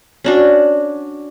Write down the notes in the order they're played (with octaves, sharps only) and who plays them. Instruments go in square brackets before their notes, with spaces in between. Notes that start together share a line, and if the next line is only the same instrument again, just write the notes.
[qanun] C#4 D4 F#4